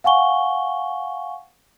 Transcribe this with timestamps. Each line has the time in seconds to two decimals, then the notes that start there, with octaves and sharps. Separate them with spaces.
0.04 F5 F#5 G#5 C#6 G7